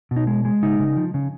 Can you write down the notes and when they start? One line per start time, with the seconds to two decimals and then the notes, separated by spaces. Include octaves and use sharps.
0.11 B2
0.16 D#4
0.27 G#3
0.45 G#3
0.62 C#3 D#4
0.80 C#3
0.96 F3
1.14 C#3